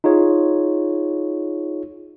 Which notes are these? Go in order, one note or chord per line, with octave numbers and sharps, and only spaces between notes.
D#4 F4 G#4 C#5